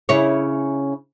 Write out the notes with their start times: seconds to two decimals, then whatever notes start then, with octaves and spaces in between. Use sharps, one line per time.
0.09 C#3 E4 C#5